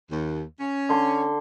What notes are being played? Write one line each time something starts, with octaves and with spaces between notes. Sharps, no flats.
D#2
C#4
D3 C6 C#6